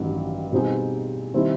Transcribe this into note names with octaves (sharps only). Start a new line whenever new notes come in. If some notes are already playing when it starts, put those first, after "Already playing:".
Already playing: A1 G2 D#3 F#3
B2 G3 C4 D#4 G#4
D#3 G3 C4 E4